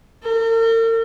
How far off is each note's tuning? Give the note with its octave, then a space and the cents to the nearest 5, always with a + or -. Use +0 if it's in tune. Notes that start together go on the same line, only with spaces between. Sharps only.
A#4 -45